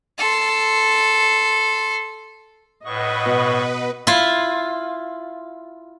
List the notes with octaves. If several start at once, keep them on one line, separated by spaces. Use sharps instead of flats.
A4 C6
A2 B4 D#5 F#5 C#6
B2
E4 F4